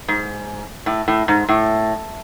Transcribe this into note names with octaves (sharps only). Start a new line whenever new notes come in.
G#2
A2
A2
G#2
A2